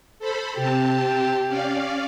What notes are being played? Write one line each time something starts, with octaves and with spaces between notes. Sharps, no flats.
A4 C5 B5
C3 C4 G4 A5
C#4 D5 F5